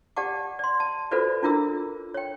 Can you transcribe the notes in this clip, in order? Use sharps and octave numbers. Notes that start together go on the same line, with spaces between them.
G4 D5 F#5 A5 D6
D5 C6
A5
F4 F#4 A4 B4 C5 D5
D4 E4 F4 A#4 D6 E6
C#5 G5